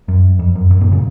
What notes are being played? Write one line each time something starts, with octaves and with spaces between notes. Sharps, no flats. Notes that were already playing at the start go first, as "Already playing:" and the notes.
F#2
F2
F#2
F#2
F#2 A#2
A#2 C#3